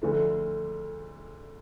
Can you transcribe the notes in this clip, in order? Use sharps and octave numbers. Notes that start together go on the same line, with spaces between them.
D2 D3 F3 A3